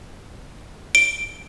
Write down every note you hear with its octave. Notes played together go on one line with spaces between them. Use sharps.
D7